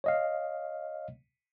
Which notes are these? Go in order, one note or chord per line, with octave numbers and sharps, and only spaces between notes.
C#5 D#5 F5